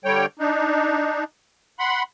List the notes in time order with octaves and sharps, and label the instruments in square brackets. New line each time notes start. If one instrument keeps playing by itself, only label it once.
[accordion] D3 G3 C#5 G5
D4 D#4
F#5 B5 C6